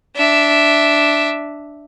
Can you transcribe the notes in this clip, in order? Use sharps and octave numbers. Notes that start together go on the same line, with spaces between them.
D4 E5